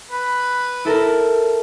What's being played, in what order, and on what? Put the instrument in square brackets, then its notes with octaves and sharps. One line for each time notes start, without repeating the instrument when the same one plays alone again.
[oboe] B4
[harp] E4 A4 A#4